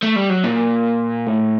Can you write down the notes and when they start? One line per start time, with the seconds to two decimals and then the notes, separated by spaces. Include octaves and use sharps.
0.02 A3
0.16 G3
0.30 F#3
0.44 A#2
1.27 A2